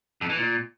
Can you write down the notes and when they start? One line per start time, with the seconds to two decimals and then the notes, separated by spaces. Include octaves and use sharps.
0.21 F2
0.29 E3
0.37 A#2